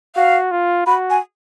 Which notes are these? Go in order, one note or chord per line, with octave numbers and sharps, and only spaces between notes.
F#4 F5
F4
F#4 B5
G#5